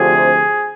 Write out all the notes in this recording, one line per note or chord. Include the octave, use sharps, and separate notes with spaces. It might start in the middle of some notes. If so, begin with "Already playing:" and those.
Already playing: D2 C3 F3 G#4